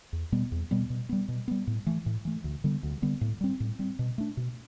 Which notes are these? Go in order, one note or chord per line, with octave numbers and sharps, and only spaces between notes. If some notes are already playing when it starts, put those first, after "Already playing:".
E2
B2 G3 B3
E2
B2 G3 B3
B2
G3 B3
B2
G3 B3
A2
E3 A3
A2
E3 A3
D2
D3 G3 B3
D2
D3 G3 B3
A2
G3 C4
A2
G3 C4
B2
A3 D4
B2